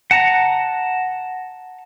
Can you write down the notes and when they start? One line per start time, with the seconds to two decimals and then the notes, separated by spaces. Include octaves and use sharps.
0.11 F#5 A5 A#5